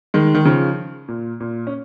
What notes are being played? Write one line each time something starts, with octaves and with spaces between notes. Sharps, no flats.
D#3 G#3
D#3
C#3 F3
A#2
A#2
C#4